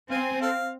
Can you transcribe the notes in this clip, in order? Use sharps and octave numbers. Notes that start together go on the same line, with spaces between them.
C4 F5 G#5
A4 F5